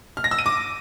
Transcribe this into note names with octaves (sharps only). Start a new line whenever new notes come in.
F6
A#6
E6
D#7
D6